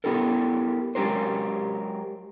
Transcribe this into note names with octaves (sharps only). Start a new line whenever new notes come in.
B3 E4 G4 A4 A#4
F#3 G#3 F4 G4 A#4 C5